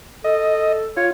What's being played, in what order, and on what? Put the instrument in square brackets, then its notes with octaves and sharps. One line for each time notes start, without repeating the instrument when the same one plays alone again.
[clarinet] A4 [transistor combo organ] D#5
[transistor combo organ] F4 [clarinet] C#5